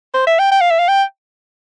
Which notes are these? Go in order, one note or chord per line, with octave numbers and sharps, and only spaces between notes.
C5
E5
G5
G5
F5
E5
F5
G5